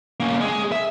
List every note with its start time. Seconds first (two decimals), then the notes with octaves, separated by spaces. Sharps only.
0.20 A#3 C#4
0.40 G#3 G#4
0.72 E5